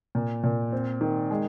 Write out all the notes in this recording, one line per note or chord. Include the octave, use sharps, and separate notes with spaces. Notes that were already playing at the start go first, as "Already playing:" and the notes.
A#2
A#2
C4
D#3
G#3